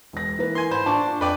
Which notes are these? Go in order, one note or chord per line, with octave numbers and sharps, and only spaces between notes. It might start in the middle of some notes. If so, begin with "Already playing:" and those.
E1 A#6
E3 A#3 B4
G#5 C6
G#2 C5 B5
D4 F4 A5 C#6
F2 B4 D5 G5